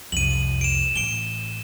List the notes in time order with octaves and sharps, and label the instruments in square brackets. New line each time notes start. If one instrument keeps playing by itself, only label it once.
[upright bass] C2 F2 [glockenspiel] D#7 F#7
[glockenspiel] D7 E7
[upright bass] A1 [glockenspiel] D7 G7